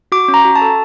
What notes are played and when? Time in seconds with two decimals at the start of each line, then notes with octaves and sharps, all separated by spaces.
0.12 F#4 D6
0.28 C#4
0.34 A#5
0.45 F#4
0.55 A5
0.61 A4